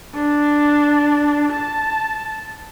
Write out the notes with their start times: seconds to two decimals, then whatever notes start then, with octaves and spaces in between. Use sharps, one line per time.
0.14 D4
1.53 A5